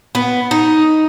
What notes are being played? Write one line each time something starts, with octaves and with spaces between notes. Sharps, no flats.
B3
D#4